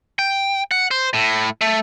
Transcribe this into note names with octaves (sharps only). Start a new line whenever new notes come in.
G5
F#5
C5
A2
A3